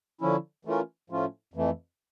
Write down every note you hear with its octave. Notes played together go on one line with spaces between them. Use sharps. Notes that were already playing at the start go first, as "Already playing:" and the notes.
D3 F3 C#4 E4
E3 A3 C#4 F4 A#4
A2 F3 A3 C#4 F4
F2 E3 A3